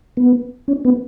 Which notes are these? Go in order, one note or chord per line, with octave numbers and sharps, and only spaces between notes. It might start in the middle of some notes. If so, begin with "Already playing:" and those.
B3
C#4
B3